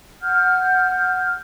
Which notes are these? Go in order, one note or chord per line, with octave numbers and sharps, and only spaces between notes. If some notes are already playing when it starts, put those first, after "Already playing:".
F#5 F6 G6